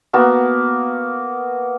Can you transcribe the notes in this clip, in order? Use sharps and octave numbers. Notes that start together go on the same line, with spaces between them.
A#3 B3 F#4 A5